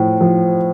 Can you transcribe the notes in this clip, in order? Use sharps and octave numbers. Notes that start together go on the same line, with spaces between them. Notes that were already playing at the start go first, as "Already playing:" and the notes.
Already playing: A2 F3
F3